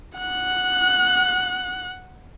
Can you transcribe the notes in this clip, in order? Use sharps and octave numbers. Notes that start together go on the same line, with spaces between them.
F#5 F#6